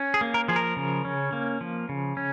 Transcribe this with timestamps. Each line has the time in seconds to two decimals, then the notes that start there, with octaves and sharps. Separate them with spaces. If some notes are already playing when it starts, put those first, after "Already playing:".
Already playing: C#4
0.14 G#4
0.21 A#3
0.34 A#4
0.48 F3 G#4
0.56 A#4
0.76 C#3
1.05 C#4
1.33 A#3
1.61 F3
1.89 C#3
2.17 C#4